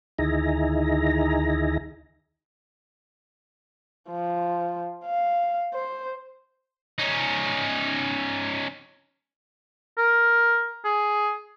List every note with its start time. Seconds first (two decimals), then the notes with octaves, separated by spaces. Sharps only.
0.19 D2 D#3 D#4 E4 G#4 A#5
4.10 F3
5.05 F5
5.74 C5
6.99 C#4 D#4
9.98 A#4
10.85 G#4